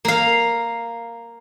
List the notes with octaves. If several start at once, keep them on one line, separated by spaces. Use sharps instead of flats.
A#3 F5